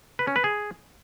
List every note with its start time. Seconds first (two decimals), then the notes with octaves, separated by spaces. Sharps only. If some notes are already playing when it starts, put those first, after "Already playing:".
0.19 B4
0.27 C#4
0.36 B4
0.44 G#4